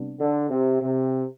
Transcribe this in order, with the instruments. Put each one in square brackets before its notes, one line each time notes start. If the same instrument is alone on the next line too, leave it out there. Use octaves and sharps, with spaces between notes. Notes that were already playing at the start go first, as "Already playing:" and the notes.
Already playing: [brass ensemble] C3 G3 B3 D4
[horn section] D3
C3
C3